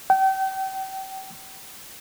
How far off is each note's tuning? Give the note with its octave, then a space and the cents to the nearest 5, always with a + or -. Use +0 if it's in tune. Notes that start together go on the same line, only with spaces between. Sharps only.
G5 -35